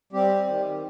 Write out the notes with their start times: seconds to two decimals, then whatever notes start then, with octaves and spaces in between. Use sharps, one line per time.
0.13 G3 C4 G4
0.48 D#3